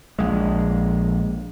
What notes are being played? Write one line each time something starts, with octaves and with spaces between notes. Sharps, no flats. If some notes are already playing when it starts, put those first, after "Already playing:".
A#1 G#3